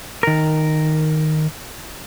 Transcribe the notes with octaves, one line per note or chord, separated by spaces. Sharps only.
D#3 A#4